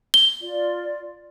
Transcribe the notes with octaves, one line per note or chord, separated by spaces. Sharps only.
G7
F4 D5